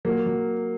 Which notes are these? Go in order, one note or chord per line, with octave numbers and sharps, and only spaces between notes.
F#3 A#3
F#3